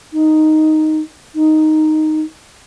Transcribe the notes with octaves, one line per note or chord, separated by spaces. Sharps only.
D#4
D#4